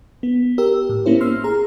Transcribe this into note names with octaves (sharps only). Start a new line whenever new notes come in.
B3
G4 A#4 E6
A2
A#3 B3 C#4 E4 C5
C6 E6 F6 C7
G#4 A#5